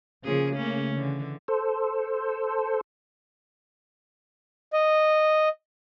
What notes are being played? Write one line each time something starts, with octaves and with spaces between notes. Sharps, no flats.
C#3 F3 A#3 G#4
A3 A#3 C#4
D3 E3
A4 C5
D#5